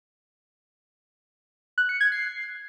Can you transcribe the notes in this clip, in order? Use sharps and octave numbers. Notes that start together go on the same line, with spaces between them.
F#6
C#7
G#6
C7